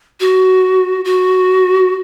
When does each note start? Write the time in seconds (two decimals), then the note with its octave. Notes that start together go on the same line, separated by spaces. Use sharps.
0.20 F#4
1.05 F#4